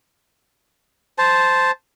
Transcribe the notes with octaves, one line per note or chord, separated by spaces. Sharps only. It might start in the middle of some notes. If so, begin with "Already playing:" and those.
C5 A5